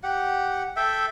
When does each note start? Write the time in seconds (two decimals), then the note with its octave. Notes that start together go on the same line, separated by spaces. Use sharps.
0.03 G4 F#5
0.76 A4 E5 G5